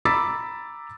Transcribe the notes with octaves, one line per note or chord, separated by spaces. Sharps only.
A#5 B5 D6 E6 A6 B6